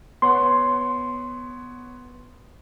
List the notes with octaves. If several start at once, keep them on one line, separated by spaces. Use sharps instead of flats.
B3 C#5 F#5 C6